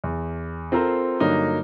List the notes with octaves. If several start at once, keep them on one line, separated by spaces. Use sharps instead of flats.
E2
C4 F4 A4 A#4 C5
G2 D3 F#3 A#3 D#4